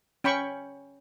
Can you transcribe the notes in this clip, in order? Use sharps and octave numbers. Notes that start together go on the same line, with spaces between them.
C#4 G5 B5 C#6